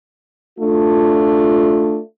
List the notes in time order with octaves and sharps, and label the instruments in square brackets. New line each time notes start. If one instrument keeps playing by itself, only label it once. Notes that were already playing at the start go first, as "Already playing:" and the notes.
[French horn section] A3 D4 F4